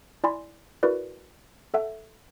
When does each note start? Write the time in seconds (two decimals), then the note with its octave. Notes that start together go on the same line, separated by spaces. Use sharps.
0.24 E4 D5 G#5 B5 C6
0.83 E4 F#4 A#4 B4 D5
1.74 A4 E5 F#5